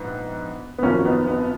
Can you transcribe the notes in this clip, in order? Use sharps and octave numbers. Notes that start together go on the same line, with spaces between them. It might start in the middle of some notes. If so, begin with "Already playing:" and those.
Already playing: A#1 G#2 B3
B3
G#1 F#2 F3 A#3 C#4
B3 D#4
B3